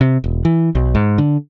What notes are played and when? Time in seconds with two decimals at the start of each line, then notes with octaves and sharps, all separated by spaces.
0.01 C3
0.24 E1
0.45 E3
0.75 B1
0.95 G#2
1.18 D3